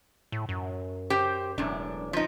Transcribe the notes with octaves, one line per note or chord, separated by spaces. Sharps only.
A2
F#2
G4 C5 G5
E1 F#2 A2 D4
F3 D#4